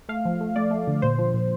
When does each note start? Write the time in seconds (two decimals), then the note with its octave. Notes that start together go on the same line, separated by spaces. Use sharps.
0.09 A3 F5
0.25 F3
0.41 A3
0.56 A3 D5
0.71 A3
0.87 D3
1.02 A#2 C5
1.19 F3
1.34 A#2